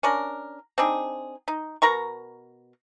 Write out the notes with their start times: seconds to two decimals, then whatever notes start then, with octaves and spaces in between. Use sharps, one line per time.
0.03 C#4 D4 A#4
0.78 C4 D4 D#4 G#4
1.48 D#4
1.82 B2 A#4 A#5 C#6